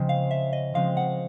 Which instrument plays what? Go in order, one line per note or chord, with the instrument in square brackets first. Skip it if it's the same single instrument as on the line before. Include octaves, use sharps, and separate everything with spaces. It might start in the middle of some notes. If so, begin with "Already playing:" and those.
Already playing: [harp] C#3 F3 G#3 C4
[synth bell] F5
E5
D#5
[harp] C#3 F3 G#3 C4 [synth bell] F5
[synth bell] F#5